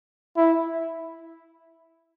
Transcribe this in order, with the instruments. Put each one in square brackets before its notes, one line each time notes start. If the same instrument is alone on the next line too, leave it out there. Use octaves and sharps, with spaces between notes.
[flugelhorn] E4